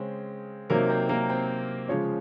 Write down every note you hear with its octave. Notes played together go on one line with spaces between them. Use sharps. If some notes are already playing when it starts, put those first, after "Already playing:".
Already playing: C#3 G#3 C4 C#4 C5
C3 F#3 A#3 C4 D#4 A#4
C4 C5
A#3 A#4
C4 C5
C#3 F3 G#3 C#4 C#5